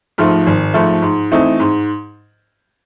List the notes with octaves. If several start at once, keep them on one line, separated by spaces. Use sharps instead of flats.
G#2 F3 A3
G#1
G#2 F3 A3
G#2
E3 A3 C4 D#4
G#2